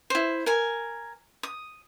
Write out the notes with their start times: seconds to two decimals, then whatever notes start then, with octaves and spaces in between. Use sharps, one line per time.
0.10 E4 C5
0.46 A#4 G#5
1.43 D#6